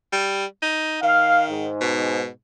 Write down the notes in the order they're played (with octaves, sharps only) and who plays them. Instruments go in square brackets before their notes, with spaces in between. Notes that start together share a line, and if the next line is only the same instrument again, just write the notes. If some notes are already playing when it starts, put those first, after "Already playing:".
[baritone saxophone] G3
D#4
[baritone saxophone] D#3 [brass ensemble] F5
[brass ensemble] G#2
[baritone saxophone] B2